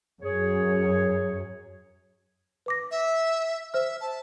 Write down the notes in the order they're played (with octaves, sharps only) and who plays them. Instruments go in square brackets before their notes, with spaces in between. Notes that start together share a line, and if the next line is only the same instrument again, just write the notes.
[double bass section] F#2 [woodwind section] G#4 C#5
[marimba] B4 D6 A#6
[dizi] E5
[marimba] C5 F6 [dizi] E5
[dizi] A5